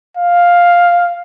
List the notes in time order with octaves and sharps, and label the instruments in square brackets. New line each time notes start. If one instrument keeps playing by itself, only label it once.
[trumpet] F5